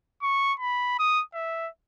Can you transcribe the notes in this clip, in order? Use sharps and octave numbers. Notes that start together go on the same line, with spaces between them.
C#6
B5
D#6
E5